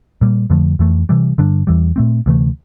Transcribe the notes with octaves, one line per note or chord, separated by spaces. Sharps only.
A#2 G3 A#3
F2 D3 F3 A3
F2 E3 A3
C3 E3 G3
G2 D3 G3 D4
E2 E3 G3
A#2 A3 C4
D2 C3 E3 A3